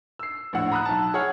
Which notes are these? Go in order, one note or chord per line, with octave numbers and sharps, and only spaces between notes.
E6 C7
A#1 A2 F#5 E6
A#5 B5 D#6 E6 F#6
B1 A5
G#4 C#5 F#5 F6